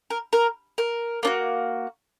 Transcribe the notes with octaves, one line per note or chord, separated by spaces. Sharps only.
A#4
A#4
A#4
A#3 D4 F#4